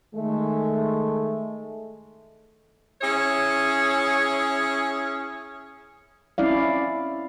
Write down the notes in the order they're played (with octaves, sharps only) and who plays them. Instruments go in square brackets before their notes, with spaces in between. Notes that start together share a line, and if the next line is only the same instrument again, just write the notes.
[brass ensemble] D#3 G#3 A3
[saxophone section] C#4 E4 G#4 C#5
[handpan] C4 C#4 E4 D5 F5